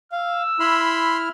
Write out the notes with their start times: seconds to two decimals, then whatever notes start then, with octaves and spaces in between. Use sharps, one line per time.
0.12 F5 E6
0.60 E4 B5 C6 F6